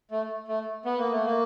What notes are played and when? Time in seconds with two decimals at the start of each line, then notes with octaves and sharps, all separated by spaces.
0.11 A3
0.48 A3
0.85 B3
0.98 A#3
1.12 A3
1.26 A#3